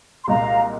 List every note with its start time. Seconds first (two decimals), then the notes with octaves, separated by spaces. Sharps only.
0.23 C6
0.27 C2 A#2 G#3 F5 A#5